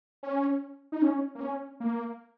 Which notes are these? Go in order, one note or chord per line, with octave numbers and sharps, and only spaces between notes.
C#4
D#4
C#4
A#3
C#4
A#3